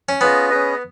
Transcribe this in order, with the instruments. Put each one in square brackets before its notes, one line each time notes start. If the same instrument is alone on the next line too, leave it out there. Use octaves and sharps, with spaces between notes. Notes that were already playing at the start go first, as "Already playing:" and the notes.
[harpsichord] C#4
[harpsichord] B3 [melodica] C#4 F4 G#4 D#5
[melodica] C#4 G#4 B4 D#5